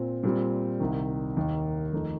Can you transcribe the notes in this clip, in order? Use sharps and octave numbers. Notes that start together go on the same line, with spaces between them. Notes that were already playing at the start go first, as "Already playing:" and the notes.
Already playing: A#2 C4
A#2 G3 C4
C2 C3 D#3
D#2 D#3 A#3 D#4
F2 D#3 A3 D#4